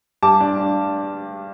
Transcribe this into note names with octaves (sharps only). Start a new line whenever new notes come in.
G2 A5 D6
D4
D4